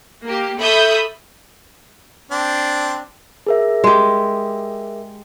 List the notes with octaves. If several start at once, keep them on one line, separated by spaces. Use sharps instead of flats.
A#3 G4
A4 E5 B5 C#6 D#6 G6
C4 D4
G#4 A#4 E5
G#3 G4